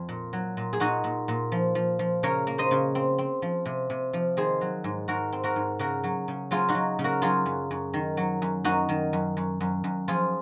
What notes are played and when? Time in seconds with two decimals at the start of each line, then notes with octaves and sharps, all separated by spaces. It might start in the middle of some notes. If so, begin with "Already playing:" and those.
Already playing: F2
0.09 A#2
0.33 F#3
0.57 A#2
0.73 G#4
0.80 A#2 D#4 F#4
1.04 A#2
1.28 A#2
1.52 F3
1.75 F3
1.99 F3
2.23 C#3 A#4 C#5
2.47 A#3
2.58 C5 D#5
2.71 C#3
2.95 C4
3.18 C4
3.42 F3
3.66 C3
3.90 C3
4.13 F3
4.37 D#3 G#4 C5
4.61 F#3
4.84 G#2
5.08 G#2 F#4 A#4
5.33 C4
5.44 F#4 A#4
5.56 G#2
5.79 C#3 F#4 A#4
6.04 F#3
6.28 C#3
6.51 F#3 F4 G#4
6.69 D#4 F#4
6.75 F#3
6.99 C#3
7.04 F#4 A#4
7.22 F#3 F4 G#4
7.46 F#2
7.71 F#2
7.94 D#3
8.17 F#3
8.42 F#2
8.64 F#2 D#4 F#4
8.89 D#3
9.13 F#2
9.37 F#2
9.61 F#2
9.84 F#2
10.08 F3 F4 G#4